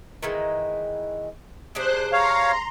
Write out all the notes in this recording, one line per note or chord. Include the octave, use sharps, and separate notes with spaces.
D#3 E3 G#3
C3 D4 G#4 C5 F#6
C#5 F5 A#5 C6